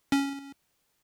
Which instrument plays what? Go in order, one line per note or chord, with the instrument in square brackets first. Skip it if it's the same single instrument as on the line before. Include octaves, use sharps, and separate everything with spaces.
[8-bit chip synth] C#4